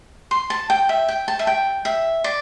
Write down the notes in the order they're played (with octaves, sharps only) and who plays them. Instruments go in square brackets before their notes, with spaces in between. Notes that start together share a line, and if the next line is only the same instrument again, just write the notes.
[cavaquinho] C6
A5
G5
E5
G5
A5
E5
G5
E5
D5